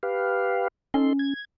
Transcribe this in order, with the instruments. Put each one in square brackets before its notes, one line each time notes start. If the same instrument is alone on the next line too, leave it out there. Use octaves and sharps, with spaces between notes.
[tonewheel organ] G4 B4 F5
[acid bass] C#4 [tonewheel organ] D#4 A4 C6
[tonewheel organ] G#6